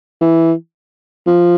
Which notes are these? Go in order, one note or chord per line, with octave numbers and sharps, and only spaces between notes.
E3
F3